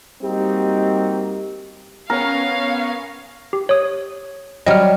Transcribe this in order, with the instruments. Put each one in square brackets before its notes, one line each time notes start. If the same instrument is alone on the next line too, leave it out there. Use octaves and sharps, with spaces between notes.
[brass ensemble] G3 A#3 C4 D#4 F#4 G4
[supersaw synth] B3 C#4 C#5 [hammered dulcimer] A#4 [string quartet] F5
[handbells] G4
C#5 D#6
[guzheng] F#3 G3 [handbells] D#5 F6